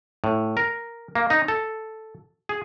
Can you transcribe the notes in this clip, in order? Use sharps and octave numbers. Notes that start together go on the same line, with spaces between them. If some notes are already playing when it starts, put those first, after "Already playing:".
A2
A#4
A#3
D#4
A4
G#4